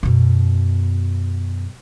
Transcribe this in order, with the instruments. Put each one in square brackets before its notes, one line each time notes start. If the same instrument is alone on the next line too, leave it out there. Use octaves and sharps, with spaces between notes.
[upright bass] F#2 B2